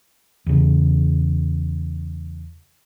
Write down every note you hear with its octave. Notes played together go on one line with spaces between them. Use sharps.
E2 C#3